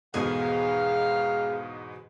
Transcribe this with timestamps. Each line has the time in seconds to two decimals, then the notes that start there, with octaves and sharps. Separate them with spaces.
0.14 E2 G#2 B2 D#3 B3 G#4 F5 G#5